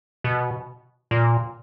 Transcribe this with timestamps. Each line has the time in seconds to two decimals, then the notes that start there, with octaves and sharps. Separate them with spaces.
0.24 B2
1.11 A#2